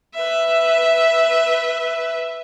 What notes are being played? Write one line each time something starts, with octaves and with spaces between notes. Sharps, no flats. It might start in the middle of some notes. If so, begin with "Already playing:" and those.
B4 E5